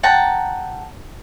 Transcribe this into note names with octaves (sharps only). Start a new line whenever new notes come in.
F#5 G5 A5 A#5